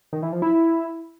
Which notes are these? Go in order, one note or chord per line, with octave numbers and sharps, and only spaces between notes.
D#3
E3
F3
E4